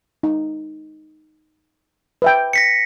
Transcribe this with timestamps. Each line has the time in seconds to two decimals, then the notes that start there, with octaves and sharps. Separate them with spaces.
0.23 D#4
2.22 B4 E5 G5
2.53 A#6 B6 C#7